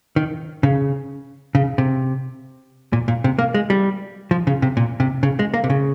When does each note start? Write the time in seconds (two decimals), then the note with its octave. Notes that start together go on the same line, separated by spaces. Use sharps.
0.16 D#3
0.63 C#3
1.55 C#3
1.78 C3
2.93 A#2
3.08 A#2
3.24 C3
3.39 A#3
3.54 G#3
3.70 G3
4.31 F3
4.47 C#3
4.62 C3
4.77 A#2
5.00 C3
5.23 C#3
5.39 G#3
5.54 A#3
5.64 C3
5.70 C#3